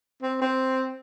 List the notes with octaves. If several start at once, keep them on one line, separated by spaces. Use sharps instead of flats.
C4
C4